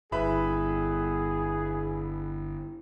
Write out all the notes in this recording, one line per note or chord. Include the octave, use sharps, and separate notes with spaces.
G1 E4 G#4 B4 E5 B5